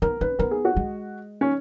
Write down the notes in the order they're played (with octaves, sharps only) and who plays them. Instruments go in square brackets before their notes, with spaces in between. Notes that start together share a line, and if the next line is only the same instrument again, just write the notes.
[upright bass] B3 [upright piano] A#4
[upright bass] C#4 [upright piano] B4
[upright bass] B3 [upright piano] A#4
[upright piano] G#4
F#4
[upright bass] G#3
[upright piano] C#4